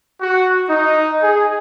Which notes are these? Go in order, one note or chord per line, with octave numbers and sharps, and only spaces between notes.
F#4
D#4
G#4